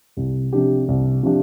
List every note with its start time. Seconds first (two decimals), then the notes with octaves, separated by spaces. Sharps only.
0.17 C2
0.53 C3 F3 D4 G4
0.88 C2
1.23 C3 F3 D4 G4